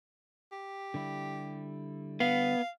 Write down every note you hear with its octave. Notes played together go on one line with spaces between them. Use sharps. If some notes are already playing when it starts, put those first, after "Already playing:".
G4
D3 G3 E4
B3 F5